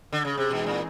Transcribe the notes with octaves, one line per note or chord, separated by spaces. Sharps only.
D3
C#3
C3
B2 E3 G#3 C4 D#4 G#4
A#2